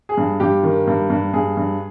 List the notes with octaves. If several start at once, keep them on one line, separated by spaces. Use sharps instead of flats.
G#4
G2
G2 G4
D#3
G2
G2
G2 G#4
G2